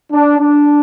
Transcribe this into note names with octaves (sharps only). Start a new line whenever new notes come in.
D4
D4